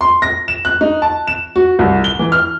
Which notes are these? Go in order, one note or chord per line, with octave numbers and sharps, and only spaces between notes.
C6
A#6
E7
F#6
D#4
A5
E7
F#4
C2
G7
E3
F6